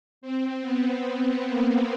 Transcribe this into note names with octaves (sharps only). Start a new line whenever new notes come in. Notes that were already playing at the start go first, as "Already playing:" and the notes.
C4
B3
C4
A#3